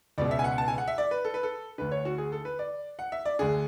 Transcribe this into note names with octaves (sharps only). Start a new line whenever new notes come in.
C#2 B2 D5
E5
G#5
F#5
A5
G#5
F#5
E5
D5
B4
A4
B4
A4
D2 D3 B4
C#5
F#4
G#4
A4
B4
D5
F#5
E5
D5
D2 D3 G#4